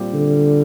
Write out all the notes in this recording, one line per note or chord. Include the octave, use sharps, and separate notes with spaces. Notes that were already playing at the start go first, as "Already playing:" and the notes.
Already playing: A#2 G3 C4
D3